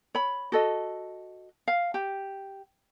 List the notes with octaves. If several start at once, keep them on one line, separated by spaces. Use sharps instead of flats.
C#5 B5
F#4 A4 D#5
F5
G4